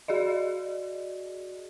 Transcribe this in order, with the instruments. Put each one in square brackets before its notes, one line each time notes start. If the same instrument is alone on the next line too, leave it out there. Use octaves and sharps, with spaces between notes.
[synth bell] F#4 G#4 D5 D#5